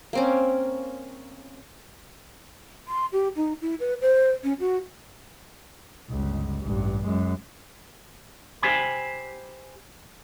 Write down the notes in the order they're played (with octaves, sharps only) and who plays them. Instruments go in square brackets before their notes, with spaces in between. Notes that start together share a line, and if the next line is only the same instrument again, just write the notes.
[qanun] A#3 C4 C#4
[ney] C6
G4
D#4
E4
B4
C5
C#4
F#4
[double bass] G1 C#2
A1 G2
F#2 G#3
[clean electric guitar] G4 C5 G#5 B5